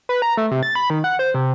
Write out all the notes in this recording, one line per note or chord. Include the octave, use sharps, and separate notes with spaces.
B4
A#5
A3
C3
A6
B5
D#3
F#5
C5
C3